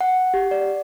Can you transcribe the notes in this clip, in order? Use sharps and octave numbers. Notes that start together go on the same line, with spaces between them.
F#5
G4
D5